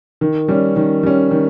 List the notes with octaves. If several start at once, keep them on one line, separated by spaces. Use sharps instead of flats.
D#3
G3 C#4
D#3
G3 C#4
D#3